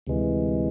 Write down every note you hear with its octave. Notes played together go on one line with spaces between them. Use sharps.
D2 C3 E3 G#3